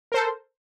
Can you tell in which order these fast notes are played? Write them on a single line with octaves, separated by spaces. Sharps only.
A#4 C5 A4